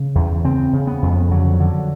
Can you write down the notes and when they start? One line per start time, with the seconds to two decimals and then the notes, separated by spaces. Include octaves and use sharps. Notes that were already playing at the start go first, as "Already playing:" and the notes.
Already playing: C#3
0.15 E2
0.44 C#3 C4
0.73 C#3
0.87 B3
1.02 F2
1.31 D3 F#3
1.60 D3